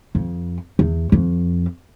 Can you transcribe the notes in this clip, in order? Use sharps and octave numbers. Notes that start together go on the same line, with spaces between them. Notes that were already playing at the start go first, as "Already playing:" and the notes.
F2
E2
F2